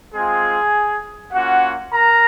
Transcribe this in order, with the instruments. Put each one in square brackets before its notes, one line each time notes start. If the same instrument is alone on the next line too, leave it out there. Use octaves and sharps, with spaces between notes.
[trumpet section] G#3 C4 F4 G#4 G#5
A#3 C#4 F4 F#4 F#5
A#4 A#5